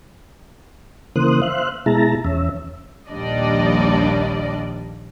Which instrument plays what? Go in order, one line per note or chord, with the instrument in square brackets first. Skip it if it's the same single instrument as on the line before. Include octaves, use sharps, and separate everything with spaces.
[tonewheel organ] C#3 E3 A#3 C5 D#6 F#6
C5 E5 F5 F#6
B2 G#3 E4 A5 A#5
E2 C#4 E5
[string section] A#1 D#2 G3 D4 D5 D#5